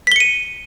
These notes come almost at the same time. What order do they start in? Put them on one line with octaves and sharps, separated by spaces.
B6 G7 C#7 D#7